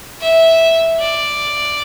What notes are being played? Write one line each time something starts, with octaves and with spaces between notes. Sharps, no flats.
E5
D5